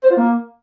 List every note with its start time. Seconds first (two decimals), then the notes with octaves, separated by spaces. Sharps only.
0.03 C5
0.10 F4
0.17 A#3